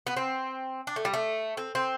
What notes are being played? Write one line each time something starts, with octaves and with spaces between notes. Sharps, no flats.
B3
C4
D4
A3
G3
A3
C4
C4